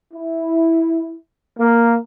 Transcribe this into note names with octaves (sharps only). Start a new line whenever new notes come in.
E4
A#3